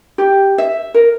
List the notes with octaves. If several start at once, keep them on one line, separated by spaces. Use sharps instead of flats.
G4
E5
A#4